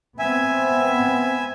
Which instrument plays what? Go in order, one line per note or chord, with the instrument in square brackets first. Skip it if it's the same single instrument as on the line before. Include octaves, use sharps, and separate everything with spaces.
[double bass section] B3 C4 [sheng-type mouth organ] E5 G#5